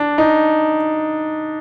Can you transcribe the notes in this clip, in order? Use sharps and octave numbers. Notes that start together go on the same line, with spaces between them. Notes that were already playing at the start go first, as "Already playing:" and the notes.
Already playing: D4
D#4